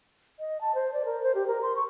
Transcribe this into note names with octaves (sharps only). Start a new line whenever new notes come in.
D#5
A5
C5
D5
A#4
C5
G4
A#4
C6
C#6